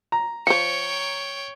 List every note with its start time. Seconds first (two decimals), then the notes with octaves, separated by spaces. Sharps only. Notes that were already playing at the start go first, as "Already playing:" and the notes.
0.12 A#5
0.47 F3 C5 C#5 G5 C#7